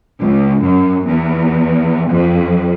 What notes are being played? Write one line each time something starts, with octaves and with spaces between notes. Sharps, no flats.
C#2
F#2
E2
F2